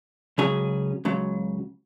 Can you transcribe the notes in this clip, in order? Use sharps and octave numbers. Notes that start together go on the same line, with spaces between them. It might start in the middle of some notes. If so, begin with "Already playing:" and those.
C#2 C#3 F#3 C#4 G#4
C#2 C#3 F#3